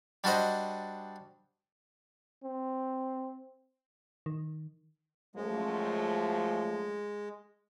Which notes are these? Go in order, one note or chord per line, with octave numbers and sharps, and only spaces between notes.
G3 D4 F#4 C5 D#5
C4
D#3
F#2 F3 G#3 A3